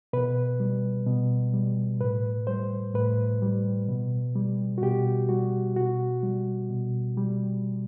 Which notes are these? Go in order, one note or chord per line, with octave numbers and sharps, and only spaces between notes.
B2 B4
G3
B2
G3
A2 B4
G3 C5
A2 B4
G3
B2
G3
F#4
B2 G4
G3 F#4
B2 F#4
G3
B2
G3